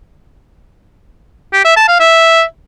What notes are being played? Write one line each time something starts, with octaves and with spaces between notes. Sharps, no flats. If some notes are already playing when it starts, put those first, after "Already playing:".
G4
E5
A5
F5
E5